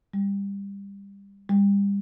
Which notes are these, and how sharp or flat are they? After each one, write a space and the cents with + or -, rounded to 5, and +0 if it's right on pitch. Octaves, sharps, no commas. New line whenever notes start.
G3 +25
G3 +35